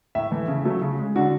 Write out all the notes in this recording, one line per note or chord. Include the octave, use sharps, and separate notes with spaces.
A2 E5
E3 A3
C#3
F#3 A3
C#3
G#3
D3 F#4